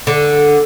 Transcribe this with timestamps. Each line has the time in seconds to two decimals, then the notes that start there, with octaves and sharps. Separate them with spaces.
0.07 D3